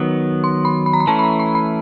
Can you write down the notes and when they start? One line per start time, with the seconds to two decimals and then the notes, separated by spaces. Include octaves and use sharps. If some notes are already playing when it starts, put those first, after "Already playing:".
Already playing: D#3 F#3 B3
0.44 C6
0.65 B5
0.86 B5
0.93 A#5
1.00 B5
1.07 E3 A3 C#4 A5
1.19 B5
1.24 A#5
1.40 B5
1.55 B5